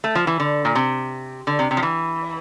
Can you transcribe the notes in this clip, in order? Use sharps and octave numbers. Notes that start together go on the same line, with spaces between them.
A3
F3
E3
D3
A#2
C3
D3
C3
C3
F3
E3